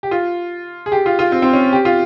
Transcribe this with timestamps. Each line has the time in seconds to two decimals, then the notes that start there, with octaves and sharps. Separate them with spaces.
0.03 G4
0.11 F4
0.86 G#4
0.92 G4
1.06 F4
1.19 F4
1.32 C4
1.42 C4
1.53 C#4
1.73 G4
1.85 F4